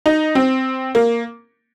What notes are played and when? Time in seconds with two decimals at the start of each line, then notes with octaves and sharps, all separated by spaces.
0.06 D#4
0.35 C4
0.95 A#3